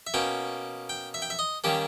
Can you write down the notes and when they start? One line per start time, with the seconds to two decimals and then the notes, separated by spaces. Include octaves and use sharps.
0.07 E5
0.14 B2 A#3 C#4 G5
0.89 G5
1.14 E5
1.22 G5
1.30 E5
1.39 D#5
1.64 D#3 G3 A#3 C#4 G4